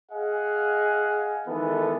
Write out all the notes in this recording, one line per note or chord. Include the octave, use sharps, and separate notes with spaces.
G#4 D#5 F5 F#5 G#5
D#3 E3 G#3 B3 A4